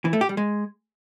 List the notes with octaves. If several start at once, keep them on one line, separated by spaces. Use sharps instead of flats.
E3
A3
G4
G3
G#3